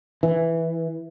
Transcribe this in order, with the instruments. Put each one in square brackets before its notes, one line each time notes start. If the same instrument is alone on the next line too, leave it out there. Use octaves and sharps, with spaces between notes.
[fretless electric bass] E3